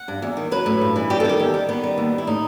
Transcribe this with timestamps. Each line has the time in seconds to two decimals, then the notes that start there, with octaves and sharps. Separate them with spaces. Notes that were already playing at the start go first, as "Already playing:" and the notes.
Already playing: F#5
0.08 G2
0.22 E2
0.37 D#3
0.51 F#3 B4
0.66 A2
0.81 G2
0.96 E3
1.10 G3 G4
1.20 A4
1.25 D#3 G4
1.40 E2
1.54 G3
1.69 D#3 B3
1.84 G3
1.98 D#2
2.12 D#2
2.18 E4
2.27 A2 D#4